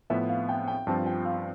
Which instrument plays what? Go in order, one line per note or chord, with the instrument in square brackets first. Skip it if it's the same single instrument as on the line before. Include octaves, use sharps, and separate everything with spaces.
[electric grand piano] A2 F3 B3 [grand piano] E5
[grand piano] F5
G5
G5
[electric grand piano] G2 F3 C4 F4 [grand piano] A5
[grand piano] G5
F5